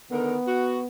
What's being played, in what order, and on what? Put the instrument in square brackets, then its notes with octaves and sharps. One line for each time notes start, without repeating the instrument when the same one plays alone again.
[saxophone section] D3 D#3 A#4 [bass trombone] B3
[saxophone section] F#4